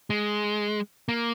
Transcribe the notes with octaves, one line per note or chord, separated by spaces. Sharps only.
G#3
A#3